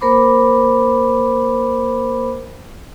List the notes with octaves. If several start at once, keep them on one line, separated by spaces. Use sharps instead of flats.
A#3 A#4 C5 B5 D6